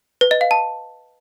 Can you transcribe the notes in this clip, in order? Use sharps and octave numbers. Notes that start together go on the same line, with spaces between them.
B4
D#5
F5
A5